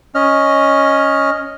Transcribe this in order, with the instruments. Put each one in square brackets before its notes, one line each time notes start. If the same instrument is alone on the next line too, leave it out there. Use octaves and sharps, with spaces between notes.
[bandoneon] C#4 D#5 F6